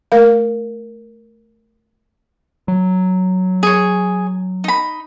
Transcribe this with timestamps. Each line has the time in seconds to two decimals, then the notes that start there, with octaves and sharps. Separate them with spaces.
0.12 A3 A#4 F5
2.68 F#3
3.63 G#4 C#5
4.64 D#4 B5